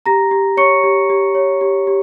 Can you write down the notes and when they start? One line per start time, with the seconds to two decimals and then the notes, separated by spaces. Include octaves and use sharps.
0.06 G4 A#5 A#6
0.31 G4
0.57 C#5 C#6 C#7
0.84 G4
1.10 G4
1.35 C#5
1.61 G4
1.87 G4